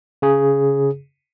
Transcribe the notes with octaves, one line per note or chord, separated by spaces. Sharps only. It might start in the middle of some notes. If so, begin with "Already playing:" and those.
C#3 G#4